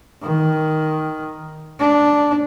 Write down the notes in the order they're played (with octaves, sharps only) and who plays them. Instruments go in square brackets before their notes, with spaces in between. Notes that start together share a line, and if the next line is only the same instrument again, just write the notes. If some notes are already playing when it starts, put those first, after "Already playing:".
[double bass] D#3
D4